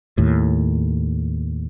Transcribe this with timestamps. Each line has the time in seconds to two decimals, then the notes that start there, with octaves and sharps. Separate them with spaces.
0.18 D#2 A2